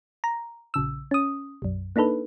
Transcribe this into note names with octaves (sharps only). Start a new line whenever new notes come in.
A#5
A#1 C#3 E6
C#4 D#6
B1 F#2
A#3 D4 D#4 A4 B4